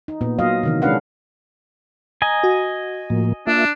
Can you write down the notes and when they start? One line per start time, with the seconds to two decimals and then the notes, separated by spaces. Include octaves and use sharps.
0.08 D#4
0.21 A#2 B3
0.39 F#3 B3 F4 D#5 F5
0.63 C3 D#3 E3
0.82 G#3 C#4 D4 B4 F5 F#5
2.22 D#5 G#5 A#5
2.43 F#4
3.10 A2 F3 A#3
3.47 A#3 D4 F4 E5